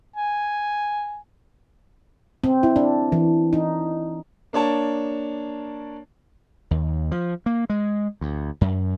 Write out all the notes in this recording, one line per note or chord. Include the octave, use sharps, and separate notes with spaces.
G#5
C4
E4
D4
E3
D#4
A#3 D4 C#5 A5
D#2
F3
A#3
G#3
D2
F#2